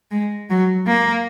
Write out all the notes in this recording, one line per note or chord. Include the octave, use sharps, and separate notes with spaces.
G#3
F#3
A#3